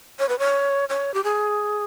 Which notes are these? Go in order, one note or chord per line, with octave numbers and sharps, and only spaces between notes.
C#5
B4
C#5
C#5
G4
G#4